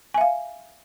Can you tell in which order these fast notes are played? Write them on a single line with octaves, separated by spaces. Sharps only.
G#5 E5 F5